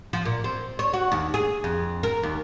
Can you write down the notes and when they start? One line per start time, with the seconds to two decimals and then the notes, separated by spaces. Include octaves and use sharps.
0.13 F3
0.25 A#2
0.44 C4
0.79 C#5
0.94 F#4
1.12 D#2
1.34 G#4
1.64 F2
2.03 A#4
2.23 D#2